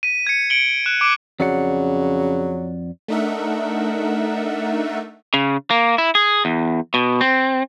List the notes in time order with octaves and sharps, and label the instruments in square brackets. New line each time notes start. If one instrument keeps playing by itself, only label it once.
[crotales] B6 D#7
G#6 C#7
C#7 D7 F#7 G7
F#6 E7
D6 D7
[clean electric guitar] F2 D5 F#5 [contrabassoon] C#3 [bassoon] F#3
[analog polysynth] A3 D4 D#4 A#4 E5 F#5
[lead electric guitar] C#3
A#3
E4
G#4
E2
B2
C4